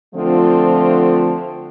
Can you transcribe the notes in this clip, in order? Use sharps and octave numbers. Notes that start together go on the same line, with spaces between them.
D3 F3 A3 C4 F4